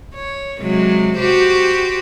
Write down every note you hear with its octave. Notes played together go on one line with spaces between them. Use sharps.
C#5
C3 F#3 G#3
F#4 G4 C5